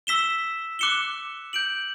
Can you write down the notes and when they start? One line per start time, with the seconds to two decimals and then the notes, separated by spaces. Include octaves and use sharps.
0.07 E6 B6 E7 G7
0.79 D6 F#6 C#7 E7 G7
1.53 G6 D7 F#7